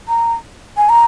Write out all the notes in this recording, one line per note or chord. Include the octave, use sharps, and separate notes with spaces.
A#5
G#5
A#5